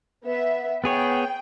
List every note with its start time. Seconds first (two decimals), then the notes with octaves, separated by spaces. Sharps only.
0.25 B3 E5
0.84 B3 G#4 C#5 G5